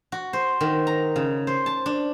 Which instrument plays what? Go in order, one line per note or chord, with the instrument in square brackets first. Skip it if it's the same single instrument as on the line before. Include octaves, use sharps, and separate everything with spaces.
[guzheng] F#4
C5
D#3
A#5
C#3
C5
A5
D4